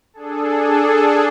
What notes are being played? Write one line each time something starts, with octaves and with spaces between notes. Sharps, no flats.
D4 G#4 A4